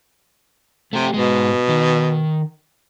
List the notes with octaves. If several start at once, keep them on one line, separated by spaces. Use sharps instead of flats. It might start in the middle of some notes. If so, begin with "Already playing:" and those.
C3 A3 G4
G#2 B2 G#3
D#3